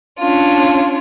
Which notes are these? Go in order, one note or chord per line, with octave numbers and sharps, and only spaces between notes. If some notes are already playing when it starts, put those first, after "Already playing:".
C#4 D4 F4